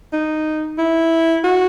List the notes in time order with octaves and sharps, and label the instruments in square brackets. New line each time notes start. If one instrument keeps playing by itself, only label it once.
[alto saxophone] D#4
E4
F#4